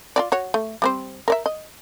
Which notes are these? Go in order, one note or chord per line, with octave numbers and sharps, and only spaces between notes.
F4 F#4 D5
F#4 C#5
A3
G3 C4 C5
A#4 D5 E5
D#5